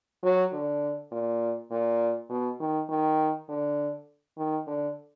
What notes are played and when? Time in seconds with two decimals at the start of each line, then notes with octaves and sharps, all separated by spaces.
0.23 F#3
0.53 D3
1.12 A#2
1.71 A#2
2.30 B2
2.60 D#3
2.89 D#3
3.49 D3
4.37 D#3
4.67 D3